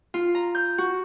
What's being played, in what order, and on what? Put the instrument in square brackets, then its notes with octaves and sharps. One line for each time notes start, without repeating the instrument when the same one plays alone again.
[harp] F4
A#5
G6
F#4